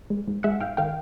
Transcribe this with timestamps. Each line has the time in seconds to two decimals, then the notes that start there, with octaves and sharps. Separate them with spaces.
0.10 G#3
0.27 G#2
0.43 G#3 E5 F#5
0.60 G#2 F5 G5
0.77 D#3 F5 G5